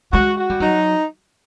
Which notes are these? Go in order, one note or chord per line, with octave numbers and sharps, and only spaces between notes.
G#3 F#4
F#4
G3
F#3 D#4